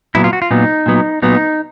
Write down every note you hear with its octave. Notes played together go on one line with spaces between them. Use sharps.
A#2 F#3 B3 E4
F4
F#4
F4
A#2 F#3 B3 D#4
A#2 F#3 B3
A#2 F#3 B3 D#4